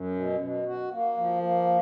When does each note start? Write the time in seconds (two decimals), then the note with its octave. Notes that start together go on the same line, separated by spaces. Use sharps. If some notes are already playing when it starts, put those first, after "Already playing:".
Already playing: F#2
0.15 B2
0.40 B2
0.65 F#4
0.92 A#3
1.17 F3
1.43 A#3